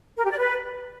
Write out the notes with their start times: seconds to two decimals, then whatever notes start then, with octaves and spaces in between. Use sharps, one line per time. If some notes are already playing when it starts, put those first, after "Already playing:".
0.17 A#4
0.24 G4
0.31 D5
0.38 B4